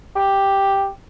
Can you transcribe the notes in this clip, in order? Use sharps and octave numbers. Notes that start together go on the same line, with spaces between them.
G4